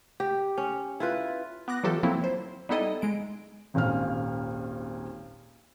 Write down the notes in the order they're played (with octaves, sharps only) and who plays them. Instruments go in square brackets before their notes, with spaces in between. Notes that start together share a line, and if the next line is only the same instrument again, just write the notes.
[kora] G4
C#4
E4 F4 B4
[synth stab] B3 D6 F#6 A#6
E3 F#3 F4 G4 A4
F3 F#3 A#3 C4 E4
C5
G3 B3 D#4 E4 A4 D#5
G#3 D7
[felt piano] D#1 G#1 A#2 C#4 F6